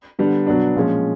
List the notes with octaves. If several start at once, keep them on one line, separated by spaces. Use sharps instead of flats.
D3 G3 B3 D4
B2 F#3 B3 D4
A#2 F3 G#3 C#4